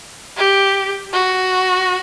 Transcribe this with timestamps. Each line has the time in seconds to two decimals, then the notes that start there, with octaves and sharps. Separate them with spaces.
0.37 G4
1.13 F#4